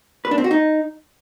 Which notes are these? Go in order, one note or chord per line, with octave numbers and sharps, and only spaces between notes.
B4
D4
C4
F#4
D#4